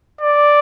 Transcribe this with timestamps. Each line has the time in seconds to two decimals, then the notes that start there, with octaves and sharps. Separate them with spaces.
0.21 D5